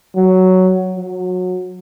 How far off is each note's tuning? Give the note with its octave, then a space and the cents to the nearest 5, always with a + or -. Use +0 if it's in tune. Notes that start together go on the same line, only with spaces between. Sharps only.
F#3 +5
F#3 -20